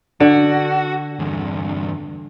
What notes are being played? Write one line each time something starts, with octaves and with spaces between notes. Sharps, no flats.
D3 F#4
E2 G2